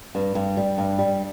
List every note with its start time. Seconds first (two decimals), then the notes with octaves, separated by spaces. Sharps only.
0.15 G2
0.35 G2
0.57 G3
0.78 G2
0.98 G3